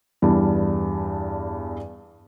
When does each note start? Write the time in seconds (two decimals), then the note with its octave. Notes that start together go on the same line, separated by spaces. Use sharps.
0.22 E2 G2 D4